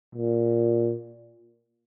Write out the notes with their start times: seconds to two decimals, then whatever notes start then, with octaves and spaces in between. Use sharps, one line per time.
0.15 A#2